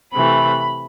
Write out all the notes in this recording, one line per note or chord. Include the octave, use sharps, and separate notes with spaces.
C3 E3 A3 B5